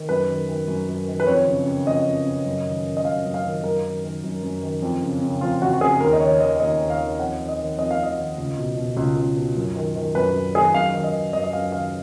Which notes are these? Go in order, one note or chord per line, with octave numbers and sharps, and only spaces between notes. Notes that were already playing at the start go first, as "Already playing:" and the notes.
Already playing: D#3
F#2 B4
D#3
D#3
F#2
F#2
D#3
B4
F2 C#5
C#3
C#3
F2 D#5
F2
C#3
F#2
D#3
D#3
D#5
F#2 F5
F#2
F5
D#3
F#2 A#4
D#3
D#3
F#2
F#2
D#3
F2
C#3
C#3
F2 F4
F2 F#4
F#4
C#3 G#4
D#2 A#4
D#5
D#3 C#5
D#3 D#5
D#2 D#5
D#2
F5
D#3
F2 F#5
D#3
D#5
D#3
F2 D#5
F5
F2 D#5
D#3
C#2
B2
B2
C#2
C#2
B2
F#2
D#3
D#3
F#2 B4
F#2
D#3 G#4
F#2 F5
D#3
D#5
D#3
F#2 D#5
D#5
F#2 F5
D#3 F5